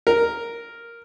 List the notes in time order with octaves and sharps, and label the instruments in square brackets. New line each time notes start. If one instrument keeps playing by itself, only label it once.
[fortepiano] A#4